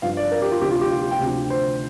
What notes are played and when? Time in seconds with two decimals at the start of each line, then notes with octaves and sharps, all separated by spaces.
0.02 G2 F3 F5
0.17 D5
0.31 A#4
0.42 G4
0.51 F4
0.61 D2 C3 F3 G4
0.71 F4
0.81 G4
0.91 F4
1.01 G4
1.11 G5
1.21 D2 C3 F3
1.50 C5